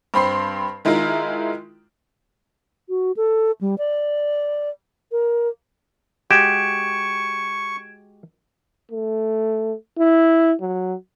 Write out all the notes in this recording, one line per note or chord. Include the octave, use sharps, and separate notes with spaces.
G2 C4 B5 C6 C7
D#3 G#3 E4 F4 A#4
F#4
A4
G3
D5
A#4
G#3 F#4 G4 C#6 G#6 D7 E7
A3
E4
F#3